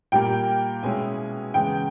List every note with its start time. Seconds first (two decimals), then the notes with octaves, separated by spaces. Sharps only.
0.12 A#2 G3 A#3 G5
0.83 B2 G#3 C#4 E4 G#5
1.54 E2 C#3 G#3 B3 G5